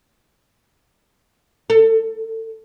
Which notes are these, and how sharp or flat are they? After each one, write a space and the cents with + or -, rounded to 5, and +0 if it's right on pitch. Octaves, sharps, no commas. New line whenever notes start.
A4 +30